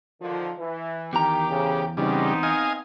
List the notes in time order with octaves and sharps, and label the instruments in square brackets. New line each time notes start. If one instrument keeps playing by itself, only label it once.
[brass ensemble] D3 D#3 F3
E3
[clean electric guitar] E2 A#5 [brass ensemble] D#3 [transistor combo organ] G4
[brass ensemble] D2 C#3
[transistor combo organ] C#3 G3 [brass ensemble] B3 C4 D#4
[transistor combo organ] D#5 F5 G#5